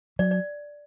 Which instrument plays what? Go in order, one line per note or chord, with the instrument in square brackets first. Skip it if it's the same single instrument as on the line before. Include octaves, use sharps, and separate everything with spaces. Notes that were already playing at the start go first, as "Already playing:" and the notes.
[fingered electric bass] F#3 [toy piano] D5
[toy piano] D5